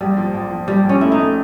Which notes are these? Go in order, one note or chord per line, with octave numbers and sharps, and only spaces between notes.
A#1 G3
F3
A#1
F3
F3 G3
A#1
C#4
A3 E4
D#4
A3